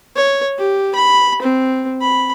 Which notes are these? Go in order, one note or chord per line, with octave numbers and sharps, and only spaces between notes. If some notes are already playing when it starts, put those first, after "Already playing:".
C#5
G4
B5
C4
B5